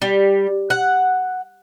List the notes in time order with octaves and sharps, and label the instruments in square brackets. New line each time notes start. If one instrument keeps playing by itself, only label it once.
[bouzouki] G3
F#5